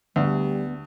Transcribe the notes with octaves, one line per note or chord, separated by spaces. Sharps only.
D2 G3 B3